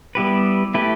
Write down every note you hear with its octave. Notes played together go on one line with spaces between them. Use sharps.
G3 B3 E4 G4 B4
A3 E4 G4 B4